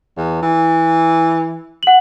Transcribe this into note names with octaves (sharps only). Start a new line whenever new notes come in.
E2
E3
F#5 F#7